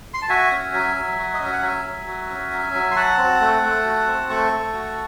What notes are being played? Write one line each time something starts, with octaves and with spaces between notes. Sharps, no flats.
C6
A5
F#4 E5 G#5
C#4
F#3
F#3
F#4
D#5
C#4 E5
F#5
F#3 E5 G#5
F#3
F#4
C#4
F#3
F#3
C6
F#4 F#5 A5
C4
A3
A3
F#4
C4
A3 A5 C#6
A3
F#4